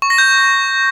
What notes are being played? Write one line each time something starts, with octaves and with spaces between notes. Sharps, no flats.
C#6
A#6
G6